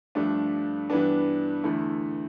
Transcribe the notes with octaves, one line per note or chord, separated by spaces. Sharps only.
G2 F3 A3 D4
G2 E3 B3 D4
E2 D3 A3 E4